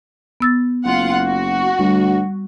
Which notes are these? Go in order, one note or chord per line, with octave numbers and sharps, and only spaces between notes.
B3 E6 A6
F#1 F4 F#5
F#4
D2 G3